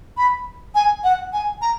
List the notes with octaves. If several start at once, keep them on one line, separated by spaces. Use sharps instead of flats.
B5
G#5
F#5
G#5
A#5